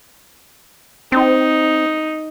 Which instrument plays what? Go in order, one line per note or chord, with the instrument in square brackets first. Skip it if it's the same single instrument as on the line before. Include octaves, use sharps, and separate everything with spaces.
[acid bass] C4 [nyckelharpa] D#4